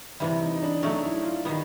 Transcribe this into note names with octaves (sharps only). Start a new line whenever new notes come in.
C3 E3 G3 E4
D#4
D#4
D4
F#3 A3 C#4 D#4
E4
F4
D#3 G3 B3